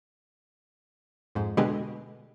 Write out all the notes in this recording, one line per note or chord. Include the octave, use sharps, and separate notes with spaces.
F2 G#2
B2 D3 G#3 B3 G4 G#4